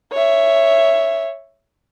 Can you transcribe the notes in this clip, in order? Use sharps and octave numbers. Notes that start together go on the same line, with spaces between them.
C#5 E5